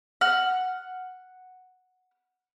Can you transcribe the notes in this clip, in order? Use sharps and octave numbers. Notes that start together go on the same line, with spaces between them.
F#5 F6